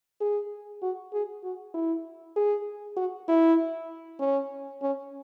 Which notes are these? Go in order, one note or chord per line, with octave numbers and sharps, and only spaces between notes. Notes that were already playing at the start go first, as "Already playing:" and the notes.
G#4
F#4
G#4
F#4
E4
G#4
F#4
E4
C#4
C#4